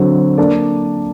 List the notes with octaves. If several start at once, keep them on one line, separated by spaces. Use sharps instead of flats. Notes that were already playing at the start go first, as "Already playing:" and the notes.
Already playing: D3 F#3 C4
A#3 D4 A4 D5